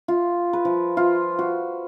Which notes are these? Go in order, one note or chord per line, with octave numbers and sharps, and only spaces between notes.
F4
B4
F3
F4
F#4